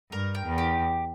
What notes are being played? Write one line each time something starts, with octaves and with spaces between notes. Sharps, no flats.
G2 A#4
G5
E2
G4